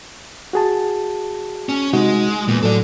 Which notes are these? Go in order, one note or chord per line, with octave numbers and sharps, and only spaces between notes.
F#4 G#4 A5
C#4
C3 G#3 D#4 F#4
E2 A#2
A2 F#3 A4 D5